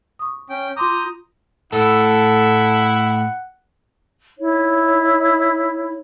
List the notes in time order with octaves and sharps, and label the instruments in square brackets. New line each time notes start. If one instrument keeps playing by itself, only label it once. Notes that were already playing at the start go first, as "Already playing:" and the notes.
[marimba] C#6 D#6
[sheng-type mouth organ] C#4 G5
[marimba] F4 C6 D6 [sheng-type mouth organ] A#5 D#6 G6
[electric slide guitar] A2 [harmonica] E4 [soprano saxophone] A4 [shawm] F#5
[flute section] D#4 E4 C#5